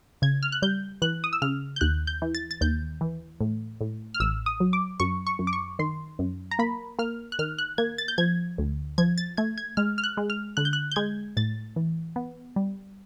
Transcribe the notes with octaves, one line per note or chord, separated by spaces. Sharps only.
C#3 G#6
F6
F#6
G3 G6
E3 F#6
D#6
E6
C#3 F6
G6
D#2 F#6
G6
E3
A6
A6
D#2 G6
E3
A2
A2
F6
A1 E6
D#6
F#3
D6
F#2 C#6
C#6
F#2
D6
C#6
D#3 C6
F#2
A#5
A#3 B5
A#3 F6
F#6
D#3 F6
F#6
A#3 G#6
A6
G6
F3 G#6
D2
F3 G#6
A6
A3 G#6
G#6
G#3 F6
F6
F#6
G#3
F6
D3 F#6
G6
F#6
G6
G#3 G#6
A2 A6
E3
B3
G3